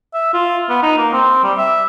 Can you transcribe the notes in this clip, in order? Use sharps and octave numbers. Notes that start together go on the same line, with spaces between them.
E5
F4
B3
D#4
A#3
C4
G3
E5